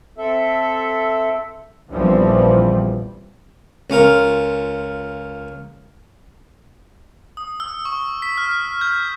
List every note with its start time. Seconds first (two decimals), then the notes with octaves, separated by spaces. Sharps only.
0.18 C4 A4 E5
1.90 A#1 E2 E3 F3 G3 C4
3.90 C#2 C#4 F4 A#4
7.37 D#6
7.60 E6
7.85 C#6
8.22 B6
8.38 F6
8.51 B6
8.81 G6